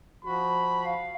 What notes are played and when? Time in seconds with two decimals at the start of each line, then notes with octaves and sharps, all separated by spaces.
0.25 F3 F#4 B5
0.86 F5